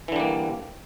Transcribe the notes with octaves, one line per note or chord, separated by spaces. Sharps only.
D3 E3 G3 A#3